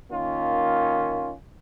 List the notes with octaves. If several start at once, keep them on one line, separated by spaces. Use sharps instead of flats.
D#3 A#3 C#4 F4